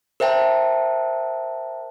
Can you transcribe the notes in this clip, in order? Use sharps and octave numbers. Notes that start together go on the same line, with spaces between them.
A#4 C5 E5 G5 A5